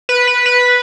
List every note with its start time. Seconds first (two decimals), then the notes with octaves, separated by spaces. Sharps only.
0.09 B4
0.27 B4
0.46 B4